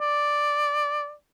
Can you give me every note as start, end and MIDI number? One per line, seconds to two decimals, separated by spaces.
0.01 1.13 74